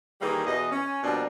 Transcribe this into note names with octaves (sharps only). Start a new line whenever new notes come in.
D#3 E3 G3 A#3 G4 G#4
E2 B2 E3 D#5
C#4
B2 F3 G3 A#3 D4